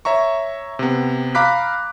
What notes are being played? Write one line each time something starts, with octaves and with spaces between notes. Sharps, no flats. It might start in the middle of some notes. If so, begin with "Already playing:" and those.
C#5 E5 A#5 C#6
C3 B3
F5 A#5 B5 D6 F#6 B6